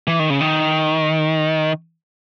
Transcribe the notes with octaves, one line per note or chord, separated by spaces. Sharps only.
E3
D#3
C#3
D#3